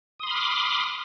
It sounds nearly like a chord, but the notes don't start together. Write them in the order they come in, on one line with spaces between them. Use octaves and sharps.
D#6 C6 B5 F6 D6